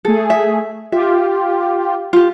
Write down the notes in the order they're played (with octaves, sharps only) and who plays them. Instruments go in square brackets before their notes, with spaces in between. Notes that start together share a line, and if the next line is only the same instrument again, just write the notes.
[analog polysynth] A3 G#4 [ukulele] A4
[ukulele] E5
[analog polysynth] F4 G4 [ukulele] E5
[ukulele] F4 G4